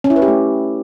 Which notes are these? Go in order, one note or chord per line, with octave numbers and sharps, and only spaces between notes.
C#4
E4
B4
G4
A3